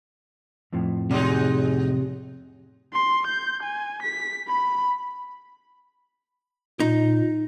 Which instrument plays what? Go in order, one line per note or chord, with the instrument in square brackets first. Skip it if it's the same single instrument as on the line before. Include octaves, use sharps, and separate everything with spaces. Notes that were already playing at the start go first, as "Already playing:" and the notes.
[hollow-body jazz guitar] F2 A2 F3
[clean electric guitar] C3 [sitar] F#3 G#3 D#4
[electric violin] C6
G6
G#5
B6
B5
[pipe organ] A#2 [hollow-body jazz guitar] D#4